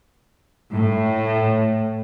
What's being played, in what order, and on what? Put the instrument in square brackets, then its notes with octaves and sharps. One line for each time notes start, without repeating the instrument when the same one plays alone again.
[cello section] A2